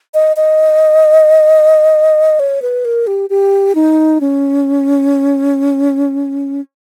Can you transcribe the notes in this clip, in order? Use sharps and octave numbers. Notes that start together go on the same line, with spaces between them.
D#5
D#5
C#5
B4
A#4
G4
G4
D#4
C#4